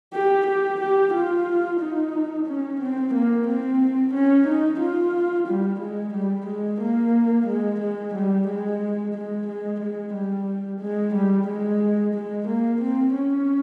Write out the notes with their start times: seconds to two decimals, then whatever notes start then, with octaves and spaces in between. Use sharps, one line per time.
0.13 G4
0.47 G4
0.81 G4
1.13 F4
1.80 D#4
2.46 C#4
2.80 C4
3.14 A#3
3.47 C4
4.14 C#4
4.47 D#4
4.80 F4
5.48 G3
5.80 G#3
6.14 G3
6.47 G#3
6.81 A#3
7.47 G#3
7.80 G#3
8.14 G3
8.48 G#3
9.14 G#3
9.47 G#3
9.81 G#3
10.13 G3
10.80 G#3
11.14 G3
11.48 G#3
12.14 G#3
12.48 A#3
12.81 C4
13.14 C#4